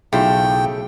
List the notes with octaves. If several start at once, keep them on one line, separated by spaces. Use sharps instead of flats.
B1 C#3 A3 E4 F4 G#4 G5